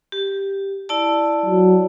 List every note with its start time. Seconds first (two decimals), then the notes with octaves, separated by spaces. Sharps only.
0.12 G4
0.89 E4 D5 A5
1.46 F#3